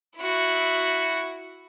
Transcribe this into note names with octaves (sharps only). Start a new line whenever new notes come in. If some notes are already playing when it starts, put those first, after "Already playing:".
E4 F#4